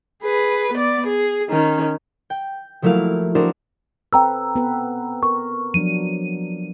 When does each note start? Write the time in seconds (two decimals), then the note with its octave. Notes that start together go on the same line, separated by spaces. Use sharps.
0.23 G#4 B4
0.74 B3 D5
1.07 G#4
1.50 D#3 C#4
2.30 G5
2.82 F3 F#3 A3 A#3 E4 F5
3.35 D4 E4 F#4 G#4 A#4 C5
4.13 C4 A4 B4 G5 A#5 E6
4.55 B3 A4 B4
5.23 A#4 C#6
5.74 F3 F#3 D4 D#7